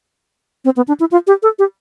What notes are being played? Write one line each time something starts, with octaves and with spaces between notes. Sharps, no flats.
C4
B3
D4
E4
F4
G4
A4
G4